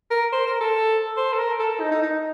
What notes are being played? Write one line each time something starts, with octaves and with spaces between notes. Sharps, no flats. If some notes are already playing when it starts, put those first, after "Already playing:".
A#4
C5
A#4
A4
C5
A4
A#4
A4
A4
D#4
D#4
D#4